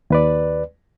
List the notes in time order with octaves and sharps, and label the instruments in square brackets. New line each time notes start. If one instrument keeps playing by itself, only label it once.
[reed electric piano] D#2 B4 D5